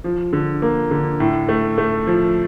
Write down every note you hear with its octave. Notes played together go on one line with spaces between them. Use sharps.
F3
D3
A#3
D3
A2
A3
A3
F3